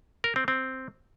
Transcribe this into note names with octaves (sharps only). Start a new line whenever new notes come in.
A#4
C4
C4